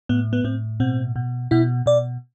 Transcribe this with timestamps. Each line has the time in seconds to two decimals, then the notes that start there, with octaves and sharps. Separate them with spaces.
0.09 A2 B3
0.33 B3
0.44 A2 C4
0.80 B2 C4
1.16 B2
1.51 B2 E4
1.86 B2 D5